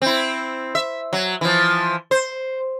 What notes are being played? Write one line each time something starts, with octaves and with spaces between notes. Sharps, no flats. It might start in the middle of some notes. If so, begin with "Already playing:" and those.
C4 E4
E5
F#3
E3 F3
C5